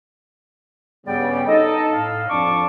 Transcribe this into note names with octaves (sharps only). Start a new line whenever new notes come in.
G2 C#3 G3 B3 D5 G5
D#4 A4 D#5
A2 F5
F2 D4 F5 A5 C#6 D6